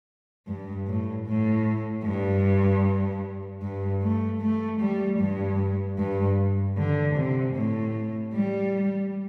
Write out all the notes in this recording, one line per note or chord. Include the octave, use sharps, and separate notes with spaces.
G2
A2
A2
G2
G2
A3
A3
G3
G2
G2
D3
C3
A2
G3